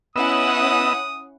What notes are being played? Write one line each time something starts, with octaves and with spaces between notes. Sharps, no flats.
B3 C#4 E4 D#5 F#5 D#6 E6